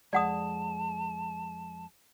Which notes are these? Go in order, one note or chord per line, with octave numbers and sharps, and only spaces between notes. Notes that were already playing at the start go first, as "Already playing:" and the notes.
F2 G#3 D5 F#5 A5 D#6